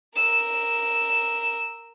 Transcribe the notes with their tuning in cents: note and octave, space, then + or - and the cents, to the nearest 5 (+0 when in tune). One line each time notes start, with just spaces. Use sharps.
A#4 -5 E6 +0